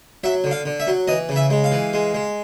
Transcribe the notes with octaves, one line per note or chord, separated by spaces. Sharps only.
F#3 E5
D3
F5
D3
E5
F#3
E3 D#5
C#3
E5
G#3
F5
E3
G#3
G#3